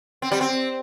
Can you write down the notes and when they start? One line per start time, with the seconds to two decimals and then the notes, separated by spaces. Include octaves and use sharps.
0.22 C4
0.32 G3
0.41 C4